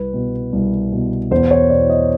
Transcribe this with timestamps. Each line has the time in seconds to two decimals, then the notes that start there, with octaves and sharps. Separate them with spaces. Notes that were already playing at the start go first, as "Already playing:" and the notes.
Already playing: C2 B4
0.14 B2
0.53 C2
0.92 B2
1.31 E2 C5
1.51 C#5
1.70 B2 D5
1.90 D#5